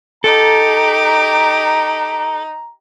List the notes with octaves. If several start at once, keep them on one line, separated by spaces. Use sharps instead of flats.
D#4 G4 A4 A#5 D6